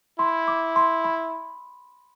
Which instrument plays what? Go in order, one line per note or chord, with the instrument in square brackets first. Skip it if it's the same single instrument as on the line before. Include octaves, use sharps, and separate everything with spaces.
[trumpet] E4 [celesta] C6
[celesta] D6
C6
B5